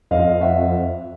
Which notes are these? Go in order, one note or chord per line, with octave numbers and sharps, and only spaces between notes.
F2 D#5 F5
E5 F#5